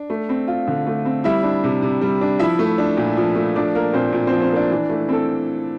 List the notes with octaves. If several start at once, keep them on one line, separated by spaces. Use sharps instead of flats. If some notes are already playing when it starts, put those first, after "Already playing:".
Already playing: D4
A3
C4
F4
D3
A3
C4
G3 E4 E5
D4
C3
C3
G3
D4
F3 E4 E5
A3
D4
A#2
F3
A3
F3 D4 D5
A#3 A#4
A#2 C4 C5
A#2
F3 C4 C5
C4 C5
A#3 D4 D5
E3
A3
C4 A4